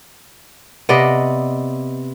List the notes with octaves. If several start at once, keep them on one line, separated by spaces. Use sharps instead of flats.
C3 B3 D5 D#5